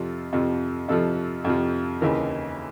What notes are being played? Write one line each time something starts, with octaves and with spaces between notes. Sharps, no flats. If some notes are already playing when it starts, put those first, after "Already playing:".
Already playing: F2 C3 F3 A4
F2 C3 F3
F2 C3 F3 A4
F2 C3 F3
D#2 C#3 E3 A#4